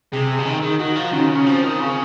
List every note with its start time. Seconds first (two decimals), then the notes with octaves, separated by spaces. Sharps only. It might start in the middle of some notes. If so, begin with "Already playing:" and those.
0.12 C3 G#4
0.39 C#3
0.46 D#3
0.62 D#3
0.79 D#3 F#4
0.95 F3
1.13 D#3 C#4
1.29 C#3
1.46 F3 C4
1.63 D#3
1.80 C#3